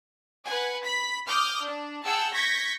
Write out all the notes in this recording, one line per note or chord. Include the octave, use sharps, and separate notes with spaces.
B4 F#5 G#5
B5 B6
D6 D#6 F6 G6
D4
G#4 F#5 G5 A5 E6
C#6 G6 G#6 A#6 B6